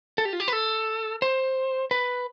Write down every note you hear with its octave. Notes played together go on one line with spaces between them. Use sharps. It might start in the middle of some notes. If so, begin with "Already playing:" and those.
A4
G4
F4
G4
B4
A4
C5
B4